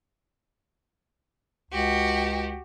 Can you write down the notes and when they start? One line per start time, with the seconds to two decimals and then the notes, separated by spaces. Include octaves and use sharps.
1.71 C#2 F#4 G4